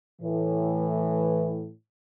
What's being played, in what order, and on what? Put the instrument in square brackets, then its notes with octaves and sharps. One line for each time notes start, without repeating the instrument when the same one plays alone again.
[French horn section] A2 E3